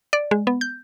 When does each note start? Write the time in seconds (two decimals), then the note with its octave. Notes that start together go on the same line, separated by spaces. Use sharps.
0.13 D5
0.31 G#3
0.47 B3
0.61 G6